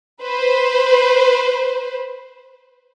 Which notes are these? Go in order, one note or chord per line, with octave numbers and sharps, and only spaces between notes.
B4 C5